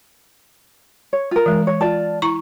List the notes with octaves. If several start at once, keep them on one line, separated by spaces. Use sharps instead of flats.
C#5
F4 A#4
E3 G#3
C#5
F4 D5 A5
E4 A#5 C#6